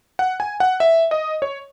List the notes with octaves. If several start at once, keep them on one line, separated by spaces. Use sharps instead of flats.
F#5
G#5
F#5
E5
D#5
C#5